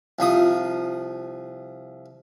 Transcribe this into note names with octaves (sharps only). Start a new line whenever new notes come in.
C2 F3 D#6